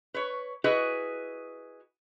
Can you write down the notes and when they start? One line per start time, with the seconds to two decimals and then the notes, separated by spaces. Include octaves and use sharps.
0.14 B4 C#5
0.64 E4 F#4 G#4 B4 D#5